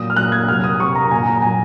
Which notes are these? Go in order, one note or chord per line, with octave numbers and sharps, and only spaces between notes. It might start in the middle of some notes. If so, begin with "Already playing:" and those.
Already playing: A#2 F#3 D#6
F6
A#2 F#3 F#6
G#6
C3 F#3 F6
D#6
C3 F#3 C#6
A#5
A#2 F#3 G#5
A#5
A#2 F#3 G#5